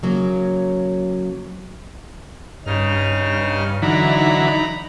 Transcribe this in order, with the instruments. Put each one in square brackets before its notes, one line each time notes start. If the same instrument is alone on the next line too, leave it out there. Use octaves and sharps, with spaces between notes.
[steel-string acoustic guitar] C#3 F#3 A#3
[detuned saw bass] G2 [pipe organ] C#3 D#4 F6
[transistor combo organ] D3 E3 F#3 [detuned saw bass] D#4 [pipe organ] A#5 B5